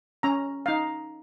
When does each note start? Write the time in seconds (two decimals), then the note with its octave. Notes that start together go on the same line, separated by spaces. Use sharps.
0.23 C#4 A#5
0.66 D#4 F5